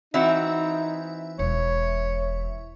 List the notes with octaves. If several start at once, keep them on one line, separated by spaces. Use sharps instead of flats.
E3 C4 D#4 F#4 E5
E1 C#5